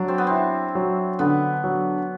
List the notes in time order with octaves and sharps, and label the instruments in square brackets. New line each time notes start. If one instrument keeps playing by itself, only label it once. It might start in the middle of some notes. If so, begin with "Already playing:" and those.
Already playing: [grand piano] F#3 [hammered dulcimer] D4
[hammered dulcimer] C4
B3
[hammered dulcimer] C4 [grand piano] E4
[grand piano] F#3
[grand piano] D3 [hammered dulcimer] B3
[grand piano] F#3